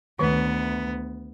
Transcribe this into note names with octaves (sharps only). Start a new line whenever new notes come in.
D2 D#3 B3 B4